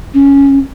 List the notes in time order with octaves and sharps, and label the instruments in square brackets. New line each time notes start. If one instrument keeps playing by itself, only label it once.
[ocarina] C#4